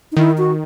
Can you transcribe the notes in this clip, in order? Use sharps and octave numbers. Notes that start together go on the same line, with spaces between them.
D#4
D#3 E4
F#4